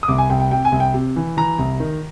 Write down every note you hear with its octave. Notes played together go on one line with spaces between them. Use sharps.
D#6
C2 D6
G#5
C2 G5
G5
C3 G5
G#5
C2
G5
C3
E3
E3 A#5
C2
D#3